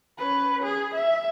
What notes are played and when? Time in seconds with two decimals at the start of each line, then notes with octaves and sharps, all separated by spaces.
0.18 C#4 B4
0.63 G#4
0.95 E5